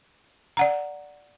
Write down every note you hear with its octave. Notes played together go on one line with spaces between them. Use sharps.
D5 F#5 A#5